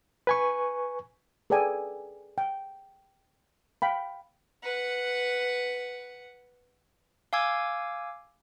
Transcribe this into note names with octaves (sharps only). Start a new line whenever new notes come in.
B4 G#5 C#6
G#4 A4 B4 D5 G5 G#5
G5
F5 G5 B5
B4 F#5
F5 G#5 D6 E6 G#6